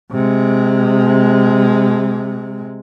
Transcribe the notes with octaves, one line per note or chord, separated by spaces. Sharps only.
C3 G#3